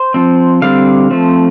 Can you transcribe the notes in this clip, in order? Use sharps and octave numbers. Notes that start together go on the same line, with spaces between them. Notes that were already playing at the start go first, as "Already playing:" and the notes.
Already playing: C5
F3 C4
D3 G3 C4 F5
F3 A3 C4